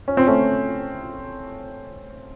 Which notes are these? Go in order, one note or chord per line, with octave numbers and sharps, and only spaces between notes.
C#4
C4
A3 C#4